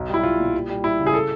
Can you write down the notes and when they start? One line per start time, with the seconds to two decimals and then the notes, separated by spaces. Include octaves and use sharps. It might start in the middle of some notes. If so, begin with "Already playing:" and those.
Already playing: B1
0.09 G3 E4
0.23 B1 F4
0.40 A#2
0.55 G3
0.70 G3
0.84 G3 E4
0.99 C#3
1.06 G#4
1.14 A4